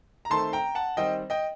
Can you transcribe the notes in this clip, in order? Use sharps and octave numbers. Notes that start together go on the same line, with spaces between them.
A#5
D#3 A3 C4 A5 C6
G5 A#5
F#5 A5
D#3 G3 C4 D#5 G5
D#5 G5